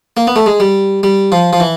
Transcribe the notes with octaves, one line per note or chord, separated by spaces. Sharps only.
A#3
B3
A3
G#3
G3
G3
F3
F3
E3